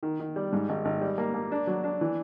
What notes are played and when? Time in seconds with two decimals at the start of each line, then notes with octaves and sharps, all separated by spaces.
0.03 D#3
0.20 D#3
0.36 G3
0.53 G#2
0.69 G#1
0.85 G#1
1.01 G3
1.18 A#3
1.34 A#3
1.52 D4
1.67 F#3
1.84 D4
2.01 E3